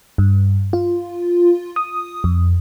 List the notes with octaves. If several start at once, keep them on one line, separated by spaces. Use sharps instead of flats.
G2
F4
D#6
F2